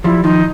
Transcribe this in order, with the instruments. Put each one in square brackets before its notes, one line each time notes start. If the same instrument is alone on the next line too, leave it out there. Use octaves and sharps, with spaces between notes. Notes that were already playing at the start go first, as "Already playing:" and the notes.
[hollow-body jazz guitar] F3 G3 [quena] E4
[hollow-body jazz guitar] D#3 F3 [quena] D#4